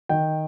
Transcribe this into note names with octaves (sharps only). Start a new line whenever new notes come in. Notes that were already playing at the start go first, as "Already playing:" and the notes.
D#3 G5